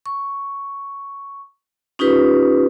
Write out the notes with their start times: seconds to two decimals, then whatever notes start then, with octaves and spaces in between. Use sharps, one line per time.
0.06 C#6
1.99 C#4 D#4 F4 G4 B4